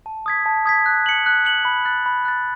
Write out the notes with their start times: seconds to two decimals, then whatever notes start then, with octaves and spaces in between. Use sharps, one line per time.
0.06 A5
0.26 D#6 G#6 B6
0.46 A5
0.66 D#6 G#6 B6
0.86 F#6
1.06 C#7 F#7
1.26 F#6
1.45 C#7 F#7
1.65 B5
1.85 F#6 A6
2.06 B5
2.25 F#6 A6